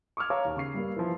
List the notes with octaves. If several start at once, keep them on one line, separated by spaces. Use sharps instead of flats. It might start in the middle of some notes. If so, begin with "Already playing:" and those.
C#6 D6 E6 F6 G#6
C#5 F5 A5 A#5 D6
D#2
C#3 C#6 C7
G2 G3 A#3
E3 F3